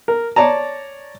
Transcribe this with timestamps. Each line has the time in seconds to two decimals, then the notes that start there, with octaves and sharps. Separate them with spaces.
0.08 A#4
0.36 C#5 D5 A5 A#5